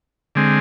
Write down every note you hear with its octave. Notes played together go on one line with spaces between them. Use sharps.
D3 G#3 C4